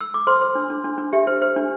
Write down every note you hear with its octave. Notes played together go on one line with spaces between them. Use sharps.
E6
D6
C5 C6
C5
D4
D4
D4
D4
G4 E5
C5
C5
D4